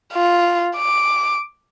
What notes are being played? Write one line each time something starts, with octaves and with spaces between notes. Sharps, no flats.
F4
D6